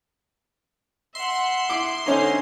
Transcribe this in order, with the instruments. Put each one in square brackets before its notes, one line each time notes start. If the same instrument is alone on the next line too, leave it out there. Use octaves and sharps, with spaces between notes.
[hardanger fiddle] E5 F#5 [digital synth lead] C6
[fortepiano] E4 D6
[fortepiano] D3 C#4 D#4 [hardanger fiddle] C5 G#5